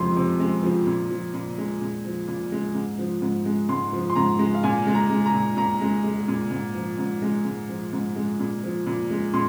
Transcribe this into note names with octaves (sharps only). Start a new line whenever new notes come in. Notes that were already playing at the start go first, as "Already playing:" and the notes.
Already playing: F2 C3 F3 G#3 C6
C3
G#3
F3
A#2
F3
A#2
G#3
A#2
F3
A#2
G#3
G#2
F3
G#2
G#3
G#2 C6
F3
C6
G#2 A#5
G#3
F5
A#2 G#5
G#3
A#5
G#3
A#5
A#2
A#2 A#5
G#3
G#3
A#2
G#2
F3
G#2
G#3
G#2
F3
G#2
G#3
A#2
F3
A#2
G#3
A#2 C6